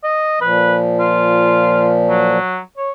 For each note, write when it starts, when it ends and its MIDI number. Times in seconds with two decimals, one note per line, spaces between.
0.04 0.40 75
0.41 2.38 46
0.41 2.38 53
0.41 0.77 71
1.00 1.95 65
2.09 2.58 54
2.77 2.90 73